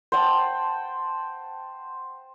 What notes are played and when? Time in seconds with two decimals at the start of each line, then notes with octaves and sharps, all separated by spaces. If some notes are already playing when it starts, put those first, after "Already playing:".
0.12 C5 F#5 G5 A5